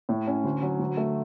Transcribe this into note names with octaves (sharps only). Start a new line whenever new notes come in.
A2
C#4
D2
F#3
D2
A3